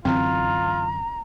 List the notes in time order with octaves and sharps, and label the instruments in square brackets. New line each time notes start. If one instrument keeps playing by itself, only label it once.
[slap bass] F#2 D3 E3 [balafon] C4 [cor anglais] F4 [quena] A#5